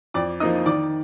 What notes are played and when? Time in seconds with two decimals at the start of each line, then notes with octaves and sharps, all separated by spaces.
0.14 F2 D5 D6
0.40 F3 A#3 D#4 D#5 D#6
0.66 D#3 D5 D6